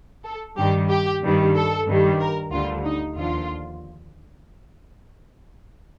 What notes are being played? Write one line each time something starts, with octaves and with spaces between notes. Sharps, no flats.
A4
G2 D#3 G3 G4
G4
G2 D#3 G3
A4
G2 D#3 G3
A#4
D2 D3 G3 F4
D#4
D#2 D3 F3 F4